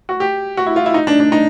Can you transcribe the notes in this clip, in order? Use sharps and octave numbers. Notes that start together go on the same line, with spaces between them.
F#4
G4
F#4
E4
F4
E4
D#4
D4
D4
D#4